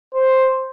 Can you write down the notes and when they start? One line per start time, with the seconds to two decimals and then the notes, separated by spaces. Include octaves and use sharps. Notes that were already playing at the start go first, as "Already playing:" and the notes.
0.14 C5